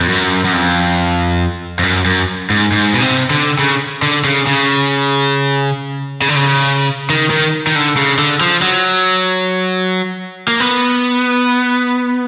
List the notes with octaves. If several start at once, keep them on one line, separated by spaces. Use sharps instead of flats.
F2
F#2
F#2
F2
F2
F#2
F#2
G#2
G#2
B2
C3
D3
C#3
D3
C#3
C#3
C#3
D3
C#3
D#3
D#3
D#3
D3
C#3
D3
F3
F#3
A#3
B3